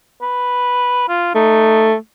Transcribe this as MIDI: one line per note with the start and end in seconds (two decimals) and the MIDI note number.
0.22 1.08 71
1.08 1.31 65
1.35 1.95 57
1.35 1.91 63